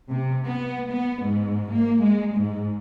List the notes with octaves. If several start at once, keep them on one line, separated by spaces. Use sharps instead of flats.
C3
B3
B3
G#2
A#3
G#3
G#2